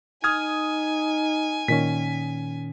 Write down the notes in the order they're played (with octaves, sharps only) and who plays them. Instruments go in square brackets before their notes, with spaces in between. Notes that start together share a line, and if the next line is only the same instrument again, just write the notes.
[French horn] D#4 [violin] G#5 [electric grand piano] D#6 F6 G#6
[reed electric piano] A#2 D#3 C#4 [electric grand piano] B6